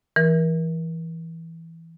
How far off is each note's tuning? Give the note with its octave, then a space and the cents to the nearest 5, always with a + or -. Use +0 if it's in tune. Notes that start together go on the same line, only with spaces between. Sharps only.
E3 +0 A#4 +35